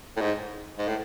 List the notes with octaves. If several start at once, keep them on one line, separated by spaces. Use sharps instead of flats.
A2
G#2
G#2
A2